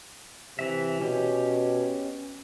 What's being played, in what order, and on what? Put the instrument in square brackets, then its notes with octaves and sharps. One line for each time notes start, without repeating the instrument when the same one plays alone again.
[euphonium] C3 [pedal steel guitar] E3 E5
[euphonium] B2 [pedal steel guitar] C#4 G4